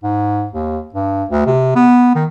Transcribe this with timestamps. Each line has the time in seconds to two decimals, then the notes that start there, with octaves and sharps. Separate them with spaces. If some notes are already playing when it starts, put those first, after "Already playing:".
0.03 G#2
0.52 D#2
0.94 G2
1.29 D2
1.46 C3
1.75 B3
2.15 D#3